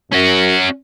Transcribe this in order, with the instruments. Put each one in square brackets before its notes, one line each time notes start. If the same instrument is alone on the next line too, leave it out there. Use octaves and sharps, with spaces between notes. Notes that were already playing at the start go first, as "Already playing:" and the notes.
[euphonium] F#2 [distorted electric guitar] C#4 F#4